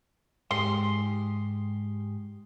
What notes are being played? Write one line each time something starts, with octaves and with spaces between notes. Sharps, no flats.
G#2 G4 G#4 C6